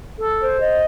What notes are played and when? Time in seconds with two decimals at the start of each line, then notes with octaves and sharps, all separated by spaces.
0.19 A4
0.39 C5
0.60 D#5